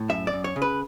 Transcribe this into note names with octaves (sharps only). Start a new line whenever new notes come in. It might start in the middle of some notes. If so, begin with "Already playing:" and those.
Already playing: A2
F#2 E5
D5
F#2
C#5
C#3
B4